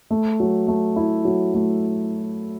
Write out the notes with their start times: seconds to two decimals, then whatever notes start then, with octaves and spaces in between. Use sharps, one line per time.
0.11 A3
0.40 F#3
0.68 A3
0.96 E4
1.25 F#3
1.54 A3